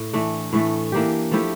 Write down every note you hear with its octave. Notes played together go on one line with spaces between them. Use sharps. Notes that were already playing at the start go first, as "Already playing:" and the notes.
Already playing: A2
E3 A3 D4
A2 E3 A3
E3 A#3 D4 G4
F3 A3 E4 G4